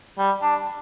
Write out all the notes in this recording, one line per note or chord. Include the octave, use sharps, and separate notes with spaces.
G3
D4